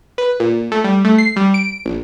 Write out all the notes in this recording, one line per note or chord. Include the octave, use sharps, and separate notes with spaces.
B4
A#2
A3
G3
A3
C7
G3
D7
A#1